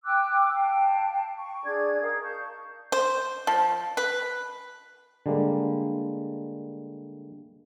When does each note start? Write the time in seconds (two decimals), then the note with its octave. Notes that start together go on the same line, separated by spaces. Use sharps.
0.04 G5 D6 E6 F#6
0.54 F5 G5 A5
1.37 C#6
1.65 D4 G#4 D5 G#6
2.01 D#4 A#4 F5 D#6
2.22 F5 A5 C#6 G6
2.92 C5
3.47 F3
3.97 B4
5.26 D3 G3 G#3 A#3